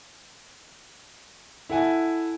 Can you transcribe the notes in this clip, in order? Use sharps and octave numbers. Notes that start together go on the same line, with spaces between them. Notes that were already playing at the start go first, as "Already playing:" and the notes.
E4 A4 F#5 G#5